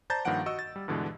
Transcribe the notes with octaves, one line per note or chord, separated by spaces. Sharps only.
C5 D5 A5 A#5 G6 A6
G2 D#3 F3 A#3 F#5 D7
F#4 D#5 C#6 E6
A6
G3
G2 B2 D3 E3 G#3